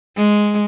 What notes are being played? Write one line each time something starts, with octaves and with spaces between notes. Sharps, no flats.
G#3